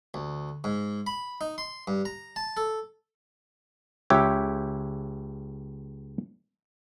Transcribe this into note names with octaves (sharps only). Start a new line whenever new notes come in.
D2
G#2
B5
D#4
C6
G2
A#5
A5
A4
C#2 G4 C#5 E5 G5